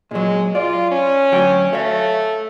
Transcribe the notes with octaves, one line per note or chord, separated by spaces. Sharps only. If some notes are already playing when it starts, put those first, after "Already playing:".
A#2 F#3 G#3
F4 D5
C#4
D2 F#3 G5
A3 C#5 F5